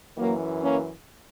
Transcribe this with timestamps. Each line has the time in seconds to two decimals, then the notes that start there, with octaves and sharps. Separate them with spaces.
0.17 F#2 E3 F#3 A#3
0.63 A#3 C#4